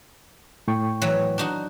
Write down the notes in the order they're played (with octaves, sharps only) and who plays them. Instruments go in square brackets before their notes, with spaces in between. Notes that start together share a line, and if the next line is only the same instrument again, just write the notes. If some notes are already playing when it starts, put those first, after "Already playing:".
[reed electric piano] A2 G5 C#6
[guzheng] E3 F#3
D4 D#4 F#4